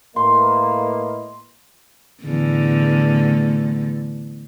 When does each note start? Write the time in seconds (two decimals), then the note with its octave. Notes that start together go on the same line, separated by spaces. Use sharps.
0.16 A2 A#3 B4 D#5 C6
2.23 E2 A2 D3